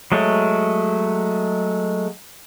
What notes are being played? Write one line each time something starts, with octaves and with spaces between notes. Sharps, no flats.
F#3 G#3 A3